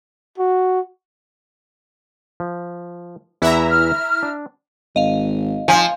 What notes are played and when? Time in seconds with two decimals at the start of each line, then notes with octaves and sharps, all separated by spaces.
0.38 F#4
2.40 F3
3.42 E2 E3 E4 E5 F#5 A#5
3.69 F6
4.23 D4
4.96 G#1 D#5 F5
5.68 F3 G#5